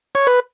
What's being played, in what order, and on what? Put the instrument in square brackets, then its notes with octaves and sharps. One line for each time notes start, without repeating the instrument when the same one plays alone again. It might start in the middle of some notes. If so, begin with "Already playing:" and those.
[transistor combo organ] C#5
B4